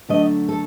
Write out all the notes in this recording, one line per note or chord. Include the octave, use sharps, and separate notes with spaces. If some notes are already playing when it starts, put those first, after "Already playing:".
D3 F#3 A3 D#5
A4